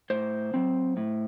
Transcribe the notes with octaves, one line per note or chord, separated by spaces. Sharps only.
A2 C5
F#3 C4
A2